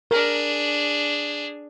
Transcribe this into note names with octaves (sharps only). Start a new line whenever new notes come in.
D4 G#4 A#4